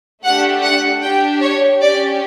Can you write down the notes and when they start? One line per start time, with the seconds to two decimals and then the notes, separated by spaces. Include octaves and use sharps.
0.24 A3 D4 G4 F#5
0.63 F#5
1.02 D4 G4 G5
1.41 C#5
1.81 C#4 G4 D5